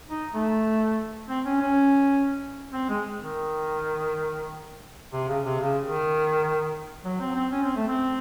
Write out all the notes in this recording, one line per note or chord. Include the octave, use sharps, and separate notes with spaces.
D#4
A3
C4
C#4
C#4
C4
G#3
D#3
C3
C#3
C3
C#3
D#3
F#3
C4
C4
C#4
C4
A3
C4